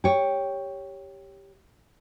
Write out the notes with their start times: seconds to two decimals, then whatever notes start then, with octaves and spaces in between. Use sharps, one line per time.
0.04 G4 C#5